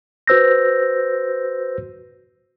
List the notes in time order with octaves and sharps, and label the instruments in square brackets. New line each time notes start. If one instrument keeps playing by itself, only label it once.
[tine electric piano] F#4 B4 C5 E6 G6 A#6